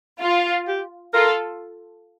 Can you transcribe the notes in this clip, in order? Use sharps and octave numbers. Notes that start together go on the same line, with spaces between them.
F4
G4
F4 A4 A#4